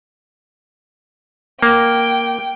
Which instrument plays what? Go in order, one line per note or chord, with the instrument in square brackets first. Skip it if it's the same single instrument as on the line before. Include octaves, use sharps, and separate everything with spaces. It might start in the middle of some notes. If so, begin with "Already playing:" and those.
[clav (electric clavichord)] A#3 [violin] G5